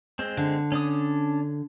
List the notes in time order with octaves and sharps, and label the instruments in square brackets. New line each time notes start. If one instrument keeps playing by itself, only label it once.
[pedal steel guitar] G#3 C4
[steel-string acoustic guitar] D3
[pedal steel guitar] C#4 D4 D#6